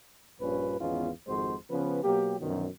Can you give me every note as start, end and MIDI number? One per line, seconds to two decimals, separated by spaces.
0.41 0.75 34
0.41 0.75 43
0.41 0.75 46
0.41 0.75 53
0.41 0.75 61
0.41 0.75 71
0.79 1.09 32
0.79 1.09 40
0.79 1.09 59
0.79 1.09 61
0.79 1.09 63
0.79 1.09 65
1.27 1.54 32
1.27 1.54 41
1.27 1.54 56
1.27 1.54 66
1.27 1.54 72
1.71 2.00 49
1.71 2.00 53
1.71 2.00 59
1.71 2.00 61
1.71 2.00 71
2.03 2.35 47
2.03 2.35 54
2.03 2.35 58
2.03 2.35 67
2.39 2.66 42
2.39 2.66 47
2.39 2.66 50
2.39 2.66 51
2.39 2.66 53
2.39 2.66 54